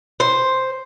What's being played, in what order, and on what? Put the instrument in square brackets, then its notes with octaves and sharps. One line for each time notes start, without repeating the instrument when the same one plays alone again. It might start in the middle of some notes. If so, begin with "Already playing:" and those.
[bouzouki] C5